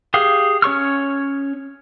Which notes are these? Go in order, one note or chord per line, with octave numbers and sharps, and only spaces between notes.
G4 G#4 F5
C#4 C#5 C#6 F6